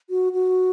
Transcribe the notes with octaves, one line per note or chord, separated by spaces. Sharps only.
F#4
F#4